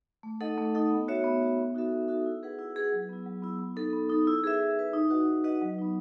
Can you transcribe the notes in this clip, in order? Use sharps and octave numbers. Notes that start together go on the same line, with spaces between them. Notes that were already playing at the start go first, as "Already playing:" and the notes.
A3
D#4 A4 D#5 F#5
A3
D#4 A4 D#5 F#5
B3
F#4 C#5 E5
B3
F#4 C#5 E5
B3
D#4 F#4 A4 E5
B3
D#4 F#4 A4 E5
E4
G#4 B4 F#5
E4
G#4 B4 F#5
F#3
B3 E4
F#3
B3 E4
B3
D#4 A4
B3
D#4 A4
E4
G#4 B4 E5
E4
G#4 B4 E5
D#4
F#4 B4 D#5 F#5
D#4
F#4 B4 D#5 F#5
F#3
B3 D#4